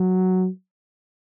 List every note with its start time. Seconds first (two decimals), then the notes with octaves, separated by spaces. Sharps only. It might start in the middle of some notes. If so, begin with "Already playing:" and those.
Already playing: F#3